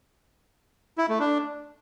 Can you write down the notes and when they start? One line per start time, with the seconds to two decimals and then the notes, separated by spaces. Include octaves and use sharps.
0.98 E4
1.09 A3
1.20 D4